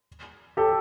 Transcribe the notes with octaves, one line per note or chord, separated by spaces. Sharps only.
G4 A4